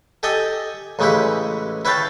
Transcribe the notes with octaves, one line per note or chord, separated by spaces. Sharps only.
G4 A4 D#5 G5 G#5
A1 C#3 G#3 E4 G4 B4
E4 B4 C#5 F5 G5 A5